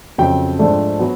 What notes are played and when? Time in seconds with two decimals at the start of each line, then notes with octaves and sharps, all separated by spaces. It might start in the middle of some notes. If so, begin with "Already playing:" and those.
0.18 F2 C#3 F#3 G5
0.59 G#2 F3 A3 D4
0.99 F#3 B3